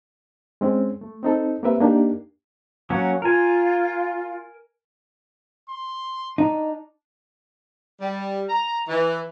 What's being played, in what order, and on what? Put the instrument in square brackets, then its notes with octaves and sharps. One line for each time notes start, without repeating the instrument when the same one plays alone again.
[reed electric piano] G#3 C4 C#4
A3
C4 D#4 A4
A#3 C4 G4 A#4 B4 E5
A#3 D4 D#4 G4
[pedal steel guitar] F#3 A#3 C#4 [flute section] F#5
[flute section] F4 [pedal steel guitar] A#4 G#5
[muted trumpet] C6
[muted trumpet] D4 [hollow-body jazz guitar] D#4
[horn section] G3
A#5
E3